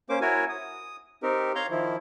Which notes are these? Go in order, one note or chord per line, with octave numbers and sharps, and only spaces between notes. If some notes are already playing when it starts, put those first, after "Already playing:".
A#3 C#4 C5 D6
E4 F#4 A#4 C#5 G#5
D#6
C4 D#4 G4 A#4
C#5 F5 A#5 C6 G6
D#3 F3 E4